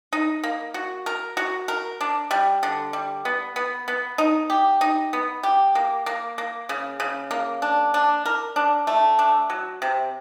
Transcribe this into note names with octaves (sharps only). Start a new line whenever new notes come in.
D#4
A#3
F#4
A#4
F#4
A#4
D4
G3
D3
G3
B3
B3
B3
D#4
G4
D#4
B3
G4
A#3
A#3
A#3
C#3
C#3
A#3
D4
D4
A#4
D4
A3
D4
F#3
C3